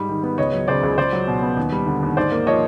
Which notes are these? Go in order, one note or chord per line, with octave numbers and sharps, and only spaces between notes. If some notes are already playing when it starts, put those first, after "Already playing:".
Already playing: G#2 G3
D#3
B3
C#2 C#5 D#5
F#3
C#3 C5 D5
C#2
C#2 C5 D5
F#3
B2
B3
D#2
G3
D3
D#2
G#2 C5 D5
A#3
F3 C#5 D#5